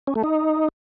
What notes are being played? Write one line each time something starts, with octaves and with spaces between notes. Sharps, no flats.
C#4
A3
D#4